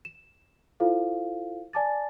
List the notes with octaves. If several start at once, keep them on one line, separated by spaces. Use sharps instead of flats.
E7
E4 F4 A4 C5 F5
D5 G#5 A5 D6 A6